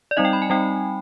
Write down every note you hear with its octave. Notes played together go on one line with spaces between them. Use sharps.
D5
G3 C4 D#4 D#5
G5
B5
G#5
G3 C4 D#4 G5